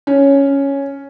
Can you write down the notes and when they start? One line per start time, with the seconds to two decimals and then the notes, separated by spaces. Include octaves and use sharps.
0.07 C#4